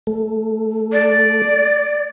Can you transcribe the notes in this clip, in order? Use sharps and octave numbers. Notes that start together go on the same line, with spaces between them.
A3 A4
D5